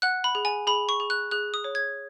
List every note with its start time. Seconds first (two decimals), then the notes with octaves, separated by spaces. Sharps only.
0.02 F#5 F#6
0.24 B5
0.35 G#4
0.45 G#5
0.67 G#4 B5
0.89 C#6
1.00 G#4
1.10 F#6
1.31 G#4 F#6
1.54 D#6
1.64 C#5
1.75 G#6